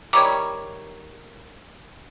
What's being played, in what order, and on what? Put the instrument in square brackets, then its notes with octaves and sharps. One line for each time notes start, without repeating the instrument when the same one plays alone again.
[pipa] D#3 G3 C#5 [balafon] D6